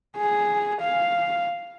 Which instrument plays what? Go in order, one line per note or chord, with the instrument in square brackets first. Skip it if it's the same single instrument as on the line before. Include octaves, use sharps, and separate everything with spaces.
[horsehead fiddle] G#4
F5